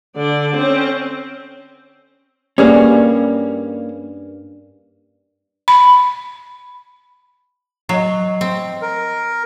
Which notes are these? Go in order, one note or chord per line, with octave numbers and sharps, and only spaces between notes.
D3 D5
C4 C#4
G2 G3 A#3 C#4 G#4
B5
F#3 D#5 C7
C4
A#4